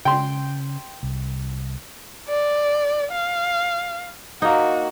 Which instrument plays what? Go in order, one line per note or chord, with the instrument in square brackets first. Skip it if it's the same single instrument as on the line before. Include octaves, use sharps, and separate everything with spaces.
[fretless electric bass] C#3 [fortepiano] G5 C6
[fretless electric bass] C2
[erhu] D5
F5
[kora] A#3 D#4 [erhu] F#4